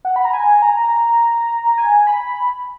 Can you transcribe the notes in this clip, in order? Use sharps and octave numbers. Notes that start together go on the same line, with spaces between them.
F#5
B5
A#5
G#5
A#5
G#5
B5